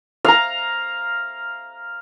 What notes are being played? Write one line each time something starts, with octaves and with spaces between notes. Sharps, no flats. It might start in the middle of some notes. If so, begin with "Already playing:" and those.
F5 A#5